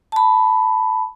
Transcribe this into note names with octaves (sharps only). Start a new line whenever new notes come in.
A5 B5